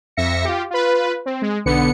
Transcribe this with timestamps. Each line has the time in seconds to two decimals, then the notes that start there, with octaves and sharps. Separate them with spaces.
0.17 F2 E5 A#6 C#7
0.45 F4 G4
0.71 F4 B4
1.26 C4
1.42 G#3
1.65 B1 D3 B3 C#7